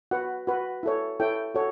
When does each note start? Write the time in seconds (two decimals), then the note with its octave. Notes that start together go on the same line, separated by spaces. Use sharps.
0.11 F#4 B4 F#5
0.47 F#4 B4
0.83 E4 A4 C#5
1.20 E4 A4 C#5 G5
1.55 F#4 A4 C#5